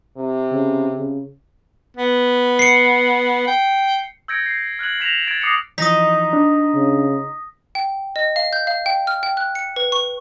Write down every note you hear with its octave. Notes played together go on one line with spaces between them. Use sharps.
C3
C#3
C#3
B3
C7 C#7
G5
E6 G6 G#6 A#6 C#7 D7
C7
F6 F#6 G#6 F#7
G6 A#6 B6 E7 F7
G#6 A6 D7
D6 D#6 G#6 A#6 C7 C#7
E3 F3 D#4 D#6 A#6 B6
D4
C#3
G5
D#5
F5
G6
F5
G5
F6
G5
F#6
C#7
B4
C#6